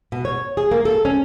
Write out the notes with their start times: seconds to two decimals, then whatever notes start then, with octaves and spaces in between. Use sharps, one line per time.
0.12 B2
0.25 C#5
0.57 G#4
0.71 A#3
0.85 A4
1.05 C#4